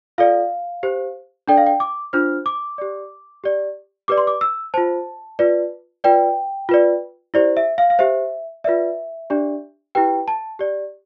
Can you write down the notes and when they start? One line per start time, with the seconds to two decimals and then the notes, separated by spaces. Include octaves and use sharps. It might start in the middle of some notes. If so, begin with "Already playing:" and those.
0.18 F4 A4 D5 F5
0.83 G4 C5
1.48 D4 A4 D5 G5
1.58 F5
1.67 G5
1.80 D6
2.13 D4 F4 C5 F6
2.46 D6
2.78 G4 D5
3.44 G4 D5
4.08 G4 B4 D5 D6
4.18 C6
4.27 D6
4.41 E6
4.74 F4 C5 A5
5.39 F4 B4 D5
6.04 F4 B4 D5 G5
6.69 F4 B4 D5
7.34 E4 G4 C5 D5
7.57 E5
7.78 F5
7.90 F5
7.99 G4 C5 E5
8.64 F4 B4 D5 E5
9.30 D4 G4 D5
9.95 E4 G4 B4 G5
10.28 A5
10.59 G4 D5